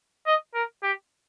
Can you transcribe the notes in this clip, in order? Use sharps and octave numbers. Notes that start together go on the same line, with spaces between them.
D#5
A#4
G4